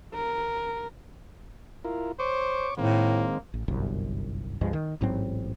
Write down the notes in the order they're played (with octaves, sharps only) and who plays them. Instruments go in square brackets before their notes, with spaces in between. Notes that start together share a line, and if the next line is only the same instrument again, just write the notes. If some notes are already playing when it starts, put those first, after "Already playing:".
[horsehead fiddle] A#4
[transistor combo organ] E4 F4 A#4
[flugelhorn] C5 [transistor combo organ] C#5 C#6 D6
[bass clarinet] A2 [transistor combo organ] D#3 G#3 C4 [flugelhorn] A#3
[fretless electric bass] A1
G1 C2 F#2
C#2 G2 F3 G#3
D#3
A1 G#2 F#3 C4